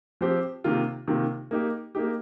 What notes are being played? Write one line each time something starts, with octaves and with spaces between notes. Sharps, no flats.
F3 C4 G4 C5
C3 D#3 A#3 F4
C3 D#3 A#3 F4
A#3 D#4 G4
A#3 D#4 G4